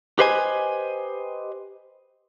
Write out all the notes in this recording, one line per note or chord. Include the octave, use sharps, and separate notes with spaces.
G4 B4 C5 D#5 G#5